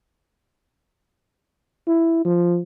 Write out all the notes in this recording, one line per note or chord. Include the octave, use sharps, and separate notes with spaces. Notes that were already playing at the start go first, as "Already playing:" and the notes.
E4
F3